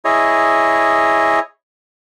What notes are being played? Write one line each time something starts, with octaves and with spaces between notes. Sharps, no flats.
E4 G#4 C#5 D#5